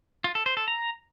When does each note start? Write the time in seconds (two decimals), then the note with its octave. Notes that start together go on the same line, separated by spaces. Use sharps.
0.24 F4
0.35 A4
0.46 C5
0.57 A4
0.68 A#5